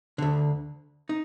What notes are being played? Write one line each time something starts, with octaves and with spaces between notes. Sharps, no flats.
D2 D3
D#4